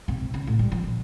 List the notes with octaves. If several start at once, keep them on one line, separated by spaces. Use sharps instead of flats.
C3
C#3
A2
G3
F3
A#1